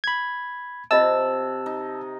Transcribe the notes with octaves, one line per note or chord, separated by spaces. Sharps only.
B5 G#6
C3 F4 D#5 E5 A5 E6
D#4